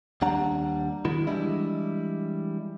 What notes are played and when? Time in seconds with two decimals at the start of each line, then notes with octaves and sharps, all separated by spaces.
0.22 D#2 G3 D4 F#5 A#5
1.05 D#3 F#3 G#3 B3 E4
1.27 E3 G3 G#3 D4 E4 D#5